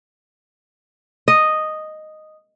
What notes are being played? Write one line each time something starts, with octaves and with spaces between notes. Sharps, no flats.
D#5